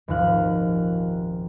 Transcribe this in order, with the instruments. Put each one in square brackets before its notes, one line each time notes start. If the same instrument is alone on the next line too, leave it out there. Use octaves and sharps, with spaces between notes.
[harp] D#1 G#1 D#2 F3 F5 F#6